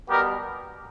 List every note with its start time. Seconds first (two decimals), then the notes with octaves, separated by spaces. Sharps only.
0.09 B2 G3 B3 G4 A#4